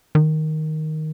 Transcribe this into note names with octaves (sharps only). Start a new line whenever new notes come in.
D#3